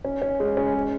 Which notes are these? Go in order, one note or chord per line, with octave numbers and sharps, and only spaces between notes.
C#4
C#4
G#3
C#4
G#3